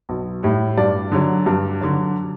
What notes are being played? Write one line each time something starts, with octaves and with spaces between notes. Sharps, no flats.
B1
A2 G3
G2 D5
D3 F#3
G2
D3 F#3